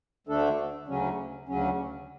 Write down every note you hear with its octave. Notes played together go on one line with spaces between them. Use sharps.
D2 D3 A3 D4 A4
D2 C#3 F#3 C#4
D2 C#3 F#3 C#4